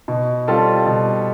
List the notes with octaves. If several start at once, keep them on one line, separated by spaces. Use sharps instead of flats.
B2
G3 C4 F4 A4
B2